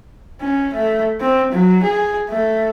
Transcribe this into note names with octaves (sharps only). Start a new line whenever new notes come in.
C#4
A3
C4
F#3
G#4
A3